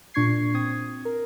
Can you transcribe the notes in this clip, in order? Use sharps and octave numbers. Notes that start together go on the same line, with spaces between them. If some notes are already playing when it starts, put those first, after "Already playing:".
A#2 D4 C#6 G#6 C7
C4 D#6 G#6
A#4